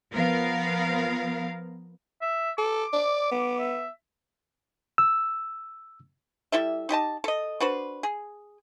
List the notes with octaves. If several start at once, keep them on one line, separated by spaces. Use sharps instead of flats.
F3 B3 A#4 F5
E5
A4 D6
D5
B3
E5
E6
G3 E4 A4 E5
D#4 G4 D#5 A5
A4 D#5
D4 F#4 B4 C5
G#4